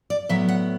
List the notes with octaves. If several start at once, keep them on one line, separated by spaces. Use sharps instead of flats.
D5
A2 F#3 B3 E5
F#5